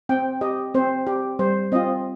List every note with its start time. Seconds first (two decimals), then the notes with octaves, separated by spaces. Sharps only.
0.09 C4 G5
0.41 G4 D#5
0.74 C4 C5
1.07 G4
1.39 G3 C5
1.72 C4 F4 D#5